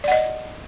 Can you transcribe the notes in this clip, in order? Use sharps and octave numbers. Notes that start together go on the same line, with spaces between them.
D5 D#5 F#5